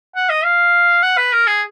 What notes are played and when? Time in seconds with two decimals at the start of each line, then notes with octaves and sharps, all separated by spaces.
0.15 F#5
0.30 D#5
0.44 F5
1.03 F#5
1.17 B4
1.32 A#4
1.47 G#4